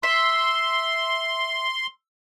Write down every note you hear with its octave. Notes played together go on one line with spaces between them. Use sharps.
E5 C6